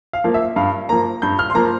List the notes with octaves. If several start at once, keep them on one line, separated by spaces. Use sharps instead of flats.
F5
F3 A#3
E5
G2 F5
F3 A#3 A#5
G2 G6
F6
C6
F3 A#3 A#5